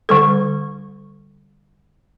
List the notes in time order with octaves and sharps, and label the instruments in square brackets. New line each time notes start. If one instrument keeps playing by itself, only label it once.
[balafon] D3 G3 A4